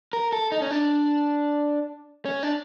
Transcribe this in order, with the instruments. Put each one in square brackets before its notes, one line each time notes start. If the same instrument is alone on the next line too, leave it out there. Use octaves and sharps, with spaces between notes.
[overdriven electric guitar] A#4
A4
D#4
C#4
D4
C#4
D4